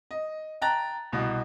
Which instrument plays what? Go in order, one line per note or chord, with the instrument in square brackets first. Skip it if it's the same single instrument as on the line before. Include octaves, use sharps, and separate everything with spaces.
[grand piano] D#5
G5 A5 A#5 F#6 A6
C2 B2